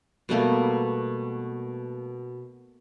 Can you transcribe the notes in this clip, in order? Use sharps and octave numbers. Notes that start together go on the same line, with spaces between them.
B2 G3 A3 A#3